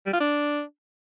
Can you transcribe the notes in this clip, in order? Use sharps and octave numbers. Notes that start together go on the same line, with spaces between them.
G3
F4
D4